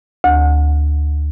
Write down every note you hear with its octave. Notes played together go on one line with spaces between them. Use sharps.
D2